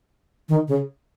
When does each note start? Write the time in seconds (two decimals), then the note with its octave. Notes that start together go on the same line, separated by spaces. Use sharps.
0.49 D#3
0.68 C#3